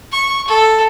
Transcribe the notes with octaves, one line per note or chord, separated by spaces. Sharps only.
C#6
A4